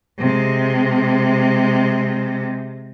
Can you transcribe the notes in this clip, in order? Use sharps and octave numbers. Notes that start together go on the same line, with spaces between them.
C3 G#3